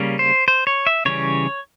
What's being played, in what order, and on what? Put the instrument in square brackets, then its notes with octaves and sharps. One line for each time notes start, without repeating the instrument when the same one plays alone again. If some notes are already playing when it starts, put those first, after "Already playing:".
Already playing: [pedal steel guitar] C#3 G3 A#3 C#4
C5
C5
C#5
E5
C#3 E3 G3 C#4 C#5